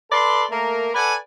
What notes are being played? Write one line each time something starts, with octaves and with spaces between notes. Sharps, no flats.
A4 B4 D5 C6
A3 A#3 A#4
A4 B4 D5 F#5 G#5